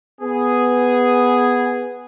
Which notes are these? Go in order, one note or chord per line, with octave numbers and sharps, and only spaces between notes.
B3 G#4